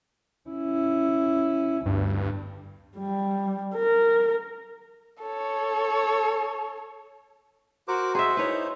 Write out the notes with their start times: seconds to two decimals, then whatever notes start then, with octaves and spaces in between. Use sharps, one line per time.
0.49 C#4 E4
1.86 G1 D2 G2
2.97 G3
3.75 A#4
5.21 A4 C#5
7.88 F#4 A#4 C5 D6
8.15 G#4 C5 E5 C6
8.37 D#4 E4 B4 C#5